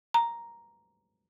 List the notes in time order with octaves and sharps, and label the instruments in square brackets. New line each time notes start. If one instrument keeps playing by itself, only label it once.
[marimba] A#5